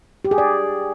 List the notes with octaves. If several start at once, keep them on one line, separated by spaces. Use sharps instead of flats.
G4
G#4
D5